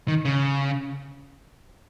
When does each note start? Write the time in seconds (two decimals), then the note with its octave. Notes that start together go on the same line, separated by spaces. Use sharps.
0.08 D#3
0.25 C#3